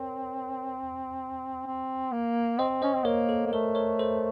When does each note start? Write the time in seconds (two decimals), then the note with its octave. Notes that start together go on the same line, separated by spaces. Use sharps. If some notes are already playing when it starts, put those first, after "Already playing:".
Already playing: C4 A#4 C#5
1.66 C4
2.12 A#3
2.58 C4 C5 D#5
2.82 C#4 C5 D#5
2.95 C4
3.05 A#3 A#4 C#5
3.29 A4
3.46 A#3
3.53 A3 A#4
3.75 A#4 C#5
3.99 A4 C5